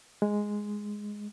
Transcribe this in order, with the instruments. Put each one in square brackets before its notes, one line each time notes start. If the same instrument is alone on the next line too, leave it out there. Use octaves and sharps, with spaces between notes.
[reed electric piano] G#3